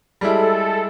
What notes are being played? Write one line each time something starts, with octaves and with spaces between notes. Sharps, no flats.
G3 G#3 E4 A4